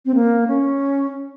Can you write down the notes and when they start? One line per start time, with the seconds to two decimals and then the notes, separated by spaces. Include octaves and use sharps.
0.06 C4
0.15 A#3
0.48 C#4